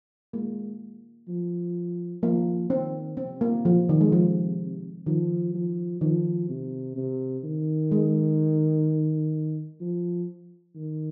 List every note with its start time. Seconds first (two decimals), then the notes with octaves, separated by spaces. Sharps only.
0.33 G#3 A#3
1.28 F3
2.23 F3 A#3
2.70 D#3 C4
3.17 C3 C4
3.41 A#3
3.65 F3
3.89 D#3
4.01 G#3
4.12 F3
5.06 D#3 F3
5.55 F3
6.01 D#3 F3
6.49 C3
6.96 C3
7.44 D#3
7.92 G#3
9.81 F3
10.76 D#3